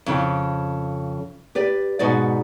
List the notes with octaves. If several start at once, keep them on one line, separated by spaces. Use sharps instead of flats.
F2 C#3 G5
G4 B4 D5
G#2 B2 D#4 F#4 D5